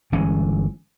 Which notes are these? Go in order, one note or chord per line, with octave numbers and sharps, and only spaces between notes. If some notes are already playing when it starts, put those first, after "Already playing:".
G1 E3 G#3 C#4